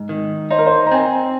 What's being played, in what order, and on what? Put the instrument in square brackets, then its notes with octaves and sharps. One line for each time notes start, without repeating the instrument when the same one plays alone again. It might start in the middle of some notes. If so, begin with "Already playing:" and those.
Already playing: [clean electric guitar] G#2
D#3
[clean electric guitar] D#4 [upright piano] C5
[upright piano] A#4
C5
A#5
[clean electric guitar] C4 [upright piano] G#5